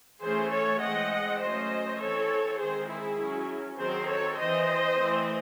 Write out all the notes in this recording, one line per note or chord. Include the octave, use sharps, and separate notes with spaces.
E3 A3 C#4 G#4 C5
A4 C#5
E3 G#3 C4 D#5 F#5
F#3 A3 C#4 C5 D#5
E3 C4 A4 C#5
D#3 G#3 C4 G#4 C5
E4 G#4
F#3 C#4
D#3 F#3 C4 G#4 C5
A4 C#5
E3 C4 C5 D#5
E3 A3 C4